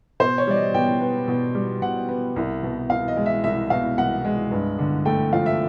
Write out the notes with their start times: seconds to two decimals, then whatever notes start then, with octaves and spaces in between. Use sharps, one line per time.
0.20 B2 C5
0.38 C#5
0.47 G3 D5
0.56 D#5
0.74 B2 G5
1.01 B3
1.28 B2
1.55 G3
1.82 B2 F#5
2.09 B3
2.36 C2
2.63 B2
2.90 C2 F5
3.08 D#5
3.16 G#3
3.26 E5
3.44 C2 E5
3.70 B2 F5
3.97 C2 F#5
4.25 G#3
4.51 G2
4.79 D3
5.05 A3 G5
5.33 F3 F5
5.46 E5